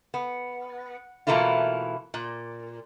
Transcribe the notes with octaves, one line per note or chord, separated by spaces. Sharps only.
B3
B2 E3 A3 A#3 E4 F4
A#2